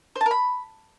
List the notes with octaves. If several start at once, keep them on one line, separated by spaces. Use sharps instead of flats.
C5
A5
A#4
B5